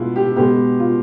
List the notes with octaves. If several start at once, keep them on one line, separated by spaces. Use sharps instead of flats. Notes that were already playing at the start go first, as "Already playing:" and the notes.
Already playing: B2 G#3 B3 E4 F4
G4
B2 G#3 B3 G4
F4